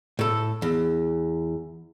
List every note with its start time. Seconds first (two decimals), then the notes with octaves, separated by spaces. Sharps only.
0.19 A2 A4
0.62 E2